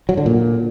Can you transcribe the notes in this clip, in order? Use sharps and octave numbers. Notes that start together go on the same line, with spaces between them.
F#3
D3
A#2